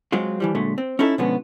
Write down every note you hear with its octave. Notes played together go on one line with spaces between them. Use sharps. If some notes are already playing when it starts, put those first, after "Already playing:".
F#3 G#3 C4 F4
E3 F3 G3
A#2 D3 F#3 G#3 A3
C4
C#4 D#4 E4 A4
B2 D3 F3 G#3 B3 C#4